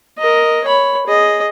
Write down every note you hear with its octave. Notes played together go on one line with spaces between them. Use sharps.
A#4 D#5
C#5 B5
G#4 D#5